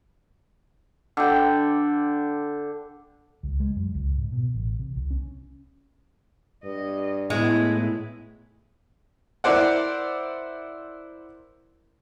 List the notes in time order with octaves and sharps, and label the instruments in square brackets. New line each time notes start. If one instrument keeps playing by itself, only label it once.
[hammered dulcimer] D3 G5
[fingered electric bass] C#2
G#3
F#2
C#2
G#2
B2
A1
C3
C2
C#4
[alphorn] G2 [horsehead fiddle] D#5
[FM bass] A2 [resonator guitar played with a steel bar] G#3 [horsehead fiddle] B3 E4
[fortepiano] E4 A#4 C5 D5 F#5